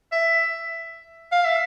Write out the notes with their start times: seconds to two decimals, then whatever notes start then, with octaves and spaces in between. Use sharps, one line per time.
0.12 E5
1.32 F5
1.45 E5